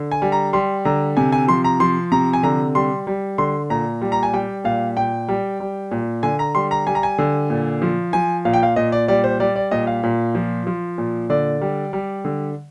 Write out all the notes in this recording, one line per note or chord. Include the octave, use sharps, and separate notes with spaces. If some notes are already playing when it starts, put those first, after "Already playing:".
Already playing: D3
G#5
G3
A#5
G3 C6
D3 A#5
C3 G#5
G#5
F3 C6
A#5
F3 C6
C3 A#5
G#5
D3 A#5
G3 C6
G3
D3 C6
A#2 A#5
G3
A#5
G#5
G3 G5
A#2 F5
A#2 G5
G3
G3
A#2
D3 G#5
A#5
G3 C6
A#5
G3 G#5
A#5
G#5
D3
A#2
F3
F3 G#5
A#2 F5
G5
F5
A#2 D#5
D5
G3 D5
C5
G3 D5
D5
A#2 D#5
F5
A#2
F3
F3
A#2
D3 D5
G3
G3
D3